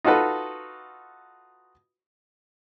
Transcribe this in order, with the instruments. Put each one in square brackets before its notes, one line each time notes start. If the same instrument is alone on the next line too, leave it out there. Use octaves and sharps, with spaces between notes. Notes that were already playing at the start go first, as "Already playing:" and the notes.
[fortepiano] D#4 F4 F#4 A4 B4